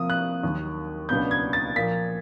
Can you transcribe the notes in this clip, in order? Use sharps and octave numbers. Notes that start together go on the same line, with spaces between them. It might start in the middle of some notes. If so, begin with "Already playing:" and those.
Already playing: C3 F3 A#3 D#6
F#6
D#2 D#3 F#3
C#2 B2 F#3 B3 D4 G6
G#6
A6
A#2 F3 A#3 B6